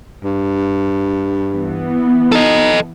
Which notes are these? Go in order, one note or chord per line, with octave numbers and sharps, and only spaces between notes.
G2
E3 B3
D#4 A4 D#5